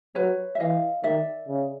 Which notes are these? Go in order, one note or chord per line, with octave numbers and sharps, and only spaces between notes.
F#3 B4 C#5
E5
E3 D#5 F5
D#3 D5 E5
C#3